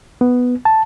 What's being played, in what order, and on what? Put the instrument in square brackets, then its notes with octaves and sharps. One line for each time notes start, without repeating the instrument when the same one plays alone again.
[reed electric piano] B3
A5